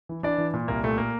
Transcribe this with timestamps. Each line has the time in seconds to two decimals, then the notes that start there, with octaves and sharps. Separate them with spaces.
0.09 E3
0.23 E3 D4 D5
0.38 E3
0.53 A#2
0.68 C2 A#3
0.83 A#2 A3
0.98 A#3